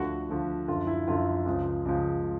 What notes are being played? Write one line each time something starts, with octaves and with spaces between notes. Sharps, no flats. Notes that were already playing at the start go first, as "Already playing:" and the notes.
Already playing: D2 D3 F3 F#4
D2 D3 F3
F#2 D3 F3 F4
E4
F#2 D3 F3 F4
C#2 C#3 F3
C#2 C#3 F3